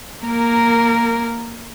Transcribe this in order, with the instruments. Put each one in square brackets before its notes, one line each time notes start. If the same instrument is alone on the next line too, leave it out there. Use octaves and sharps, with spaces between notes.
[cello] A#3 A#4